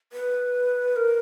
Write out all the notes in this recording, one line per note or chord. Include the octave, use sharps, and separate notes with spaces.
B4
A#4